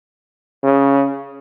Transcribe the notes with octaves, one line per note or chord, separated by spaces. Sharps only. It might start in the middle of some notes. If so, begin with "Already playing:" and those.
C#3